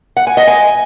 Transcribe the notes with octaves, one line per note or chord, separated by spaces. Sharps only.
F#5
G#5
D#5
G#5